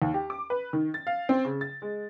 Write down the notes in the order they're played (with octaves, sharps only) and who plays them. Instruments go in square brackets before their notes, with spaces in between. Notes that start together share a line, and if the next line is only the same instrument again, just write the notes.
[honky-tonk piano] D#2
G4
D6
B4
D#3
A6
F5
C4
C#3
A6
G#3